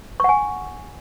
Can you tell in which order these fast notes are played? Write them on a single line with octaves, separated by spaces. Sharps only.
C#6 F#5 G#5